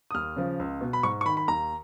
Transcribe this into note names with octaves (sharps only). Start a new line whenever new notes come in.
D#6
D#2 F6
C#3 F3
C#2
B2
B5
G#2 C#6
C#6
D#3 B5
B5
D#2 A#5